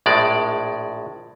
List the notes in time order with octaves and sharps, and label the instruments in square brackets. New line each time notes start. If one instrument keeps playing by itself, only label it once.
[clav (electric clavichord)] A#1 A2 G#3 D5